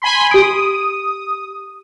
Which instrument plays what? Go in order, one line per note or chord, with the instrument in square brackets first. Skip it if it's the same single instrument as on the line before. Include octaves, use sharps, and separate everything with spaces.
[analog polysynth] G#5 B5 C6
[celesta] G4 D7 [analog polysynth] D#6